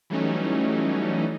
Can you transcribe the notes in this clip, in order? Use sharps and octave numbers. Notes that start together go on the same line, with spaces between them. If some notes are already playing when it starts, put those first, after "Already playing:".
E3 F#3 G3 A3 C#4 D#4